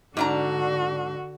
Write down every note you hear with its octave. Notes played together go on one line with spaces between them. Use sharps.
G#2 D3 D4 F#4 A#5